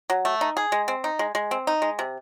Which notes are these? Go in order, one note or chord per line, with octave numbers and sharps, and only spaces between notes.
F#3
A3
D#4
G#4
G#3
C4
D#4
G#3
G#3
C4
D#4
G#3
C3